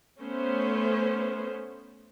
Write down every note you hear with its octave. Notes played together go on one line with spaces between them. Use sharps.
A3 B3 C#4 C5